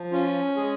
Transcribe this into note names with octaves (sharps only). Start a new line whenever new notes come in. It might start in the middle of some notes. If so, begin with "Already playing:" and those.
Already playing: F3
C#4 F4
G#3 G#4